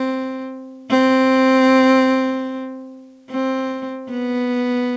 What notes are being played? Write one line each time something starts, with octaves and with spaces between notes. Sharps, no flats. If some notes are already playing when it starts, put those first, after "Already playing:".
Already playing: C4
C4
C4
B3